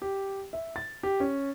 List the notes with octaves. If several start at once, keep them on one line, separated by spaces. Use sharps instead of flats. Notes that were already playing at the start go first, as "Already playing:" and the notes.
G4
E5
A6
G4
C#4